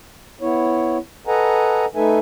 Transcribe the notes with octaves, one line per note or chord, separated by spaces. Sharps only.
B3 E4 C#5
A4 B4 D#5 F#5 G#5 A#5
A3 D#4 A4 B4 E5 G#5